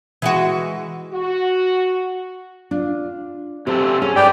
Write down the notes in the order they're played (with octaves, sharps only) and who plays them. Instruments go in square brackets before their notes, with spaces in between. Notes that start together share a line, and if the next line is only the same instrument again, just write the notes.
[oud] E3 G#3 F#4
[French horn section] F#4
[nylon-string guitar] D4 F4
[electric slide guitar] C3 C4 A4 [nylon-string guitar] G4
[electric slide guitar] C#4 [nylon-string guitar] G#4 G#5
[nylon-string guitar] G#2 [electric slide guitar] G4 B4 [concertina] D5 G5